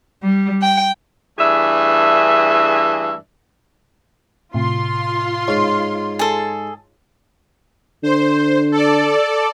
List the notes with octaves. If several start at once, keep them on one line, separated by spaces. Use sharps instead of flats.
G3
G5
G2 E3 A3 D4 G#4 E5
A2 C3 F4 C6
G#2 C#5 F6 C7
G#4 A4
D3 C5
A4 D5